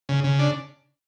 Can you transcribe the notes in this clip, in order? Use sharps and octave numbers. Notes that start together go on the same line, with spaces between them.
C#3
C#3
D4